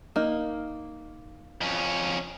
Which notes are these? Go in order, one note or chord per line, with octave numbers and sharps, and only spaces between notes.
A#3 D#4
F2 C#4